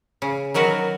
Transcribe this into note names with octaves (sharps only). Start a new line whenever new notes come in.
C#3
D#3 F#3 F#4 A#4 B4